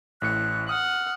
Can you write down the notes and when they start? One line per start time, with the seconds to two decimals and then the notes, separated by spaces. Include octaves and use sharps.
0.22 A1 A2 F#6 C#7
0.69 F#5 D#6 F6